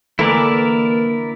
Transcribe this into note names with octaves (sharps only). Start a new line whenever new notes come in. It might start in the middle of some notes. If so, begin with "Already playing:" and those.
D3 E3 A3 A#3 E4 A#4 D5